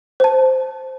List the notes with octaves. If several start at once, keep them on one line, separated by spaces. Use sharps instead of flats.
C5 A5